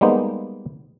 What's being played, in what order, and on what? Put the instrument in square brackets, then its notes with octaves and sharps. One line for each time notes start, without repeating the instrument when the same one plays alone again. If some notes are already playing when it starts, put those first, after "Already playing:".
[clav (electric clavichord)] G3 G#3 A#3 B3 D#4 C5